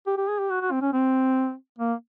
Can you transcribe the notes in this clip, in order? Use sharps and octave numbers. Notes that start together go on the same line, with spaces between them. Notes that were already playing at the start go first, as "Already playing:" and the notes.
G4
G4
G#4
G4
F#4
F#4
C4
C#4
C4
A#3